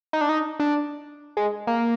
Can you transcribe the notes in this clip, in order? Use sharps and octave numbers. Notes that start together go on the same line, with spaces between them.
D#4
D4
D#4
D4
G#3
A#3